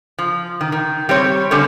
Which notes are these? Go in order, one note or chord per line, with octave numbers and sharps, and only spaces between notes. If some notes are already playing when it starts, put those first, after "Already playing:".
F3
D#3
D#3
G3 C4 C#5
D3 G3 C4 C#4 A#4 C#5